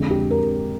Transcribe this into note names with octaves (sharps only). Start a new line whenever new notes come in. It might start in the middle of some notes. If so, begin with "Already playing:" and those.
Already playing: F2 D3 G#3
G4
A#4